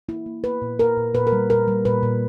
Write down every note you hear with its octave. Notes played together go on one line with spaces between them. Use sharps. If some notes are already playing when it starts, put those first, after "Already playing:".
A#3 E4
A#3
A#3 B4
A#2
A#3 A#4
A#2
A#2 B4
A#4
G3
A#2 A#4
G3
A#2 B4
A#2